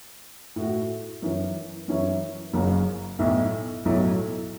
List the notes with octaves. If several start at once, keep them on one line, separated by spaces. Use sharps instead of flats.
A2 A3 F#4
F#2 E3 C#4
F#2 E3 C#4 E4
F#1 F#2 C#3 F#3
B1 A2 A3 E4
B1 A2 F#3 A3 E4